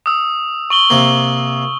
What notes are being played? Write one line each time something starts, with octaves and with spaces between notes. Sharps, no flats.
D#6 E6
C#6 F#7 G7
C3 A#3